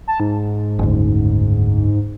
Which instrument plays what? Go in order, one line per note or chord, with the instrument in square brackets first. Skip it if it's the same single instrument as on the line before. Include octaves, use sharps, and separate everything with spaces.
[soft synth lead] A5
G#2
[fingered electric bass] F#1 D2